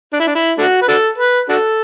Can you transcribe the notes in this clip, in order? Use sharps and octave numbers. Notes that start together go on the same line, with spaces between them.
D4
E4
D4
E4
A3 D4 F#4
B4
D4 F#4 A4
B4
D4 F#4 A4